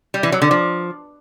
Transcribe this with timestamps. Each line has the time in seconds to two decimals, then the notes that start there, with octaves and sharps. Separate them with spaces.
0.14 G3
0.23 E3
0.32 F#3
0.42 D3
0.51 F3